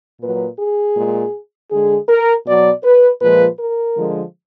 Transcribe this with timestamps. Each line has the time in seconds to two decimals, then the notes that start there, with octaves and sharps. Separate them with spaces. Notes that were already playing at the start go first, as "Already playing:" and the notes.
0.21 A#2 F#3 B4
0.59 G#4
0.97 A#2 G#3
1.71 D3 G#3 G#4
2.09 A#4
2.46 B2 F#3 D5
2.84 B4
3.21 A#2 F3 G#3 B4
3.59 A#4
3.97 D3 F3 G#3